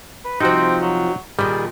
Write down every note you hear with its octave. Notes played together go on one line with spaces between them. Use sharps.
B4
C3 F3 C4 D#4 F#4
F#3
A#2 D#3 G3 G#4